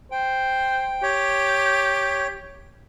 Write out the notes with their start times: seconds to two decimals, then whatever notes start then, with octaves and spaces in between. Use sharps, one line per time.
0.12 C5 G5
1.03 G4 C#5